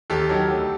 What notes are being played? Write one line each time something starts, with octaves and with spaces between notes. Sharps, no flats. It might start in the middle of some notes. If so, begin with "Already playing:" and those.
D#2 G4 A4
D#3 F#3
D2